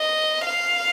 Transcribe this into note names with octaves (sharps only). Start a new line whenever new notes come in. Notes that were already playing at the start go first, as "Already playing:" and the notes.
Already playing: D#5
F5